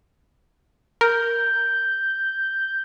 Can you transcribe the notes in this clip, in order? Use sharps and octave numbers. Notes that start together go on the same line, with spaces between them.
A#4 G6